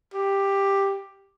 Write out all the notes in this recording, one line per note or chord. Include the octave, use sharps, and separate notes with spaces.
G4